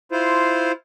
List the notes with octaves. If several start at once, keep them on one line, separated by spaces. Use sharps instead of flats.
E4 F4 C5